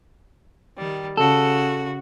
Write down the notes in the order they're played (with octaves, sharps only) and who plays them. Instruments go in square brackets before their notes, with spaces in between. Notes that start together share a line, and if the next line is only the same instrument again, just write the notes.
[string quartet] D#3 G3
[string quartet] C#3 F#4 [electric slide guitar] A4